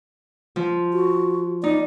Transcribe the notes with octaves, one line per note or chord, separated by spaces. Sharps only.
F3
F#4
D#4 D5